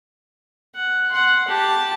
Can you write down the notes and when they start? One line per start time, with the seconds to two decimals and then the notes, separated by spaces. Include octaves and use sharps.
0.75 F#5
1.10 F#5 C6
1.48 G4 A5